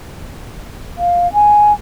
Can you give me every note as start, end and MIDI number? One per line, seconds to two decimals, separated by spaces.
0.97 1.31 77
1.33 1.73 80